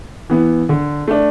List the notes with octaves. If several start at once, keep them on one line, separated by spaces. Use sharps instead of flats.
E3 B3
D3
A3 D4